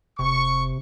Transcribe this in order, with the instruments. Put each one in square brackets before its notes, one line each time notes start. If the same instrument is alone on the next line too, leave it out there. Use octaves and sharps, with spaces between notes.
[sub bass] F1 [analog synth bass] C3 [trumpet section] C#6